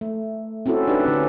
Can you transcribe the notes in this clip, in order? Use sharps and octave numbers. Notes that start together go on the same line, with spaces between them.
A3
C4 C#4 E4 F#4 A4
D4 D#4 G4 B4
D3 C#4